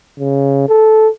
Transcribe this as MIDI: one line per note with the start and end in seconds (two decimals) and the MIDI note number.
0.19 0.68 49
0.69 1.08 69